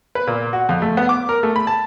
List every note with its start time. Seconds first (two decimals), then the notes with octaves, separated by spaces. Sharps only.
0.15 B4
0.27 A#2
0.53 F#4
0.69 F2
0.82 A3
0.97 B3
1.09 D6
1.29 A#4
1.43 A3
1.56 B5
1.67 A5